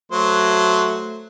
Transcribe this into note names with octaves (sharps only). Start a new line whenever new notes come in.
F#3 A3 C5